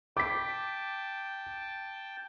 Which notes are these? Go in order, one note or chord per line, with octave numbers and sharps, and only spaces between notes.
G5 A5 D6 B6